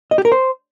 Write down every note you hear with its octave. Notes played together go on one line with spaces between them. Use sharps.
D#5
G4
A#4
C5